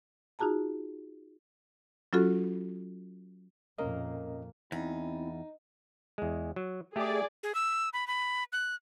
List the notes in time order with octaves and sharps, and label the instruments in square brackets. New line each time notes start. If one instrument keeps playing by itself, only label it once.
[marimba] D#4 F4 F#4 G#4 A5 A#5
F#3 C#4 F4 F#4 A4
[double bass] F2 A#2 [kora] A#3 [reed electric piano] C#4 A#4 D#5
[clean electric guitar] E2 [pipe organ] C4 E4 [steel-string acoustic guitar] D#4
[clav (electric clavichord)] E2 G#3
F#3
[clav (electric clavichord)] A3 G4 [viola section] G#4 D5
[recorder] G#4
E6
B5
B5
F#6